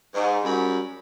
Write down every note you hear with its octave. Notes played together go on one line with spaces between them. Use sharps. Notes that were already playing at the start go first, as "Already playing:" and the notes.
G#2
F#2 G3 B5